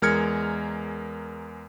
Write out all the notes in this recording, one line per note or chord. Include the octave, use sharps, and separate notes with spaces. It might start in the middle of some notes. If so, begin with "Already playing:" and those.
E2 G#3 A#4 F6 G#6 C#7